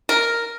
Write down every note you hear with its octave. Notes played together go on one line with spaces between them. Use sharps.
A#4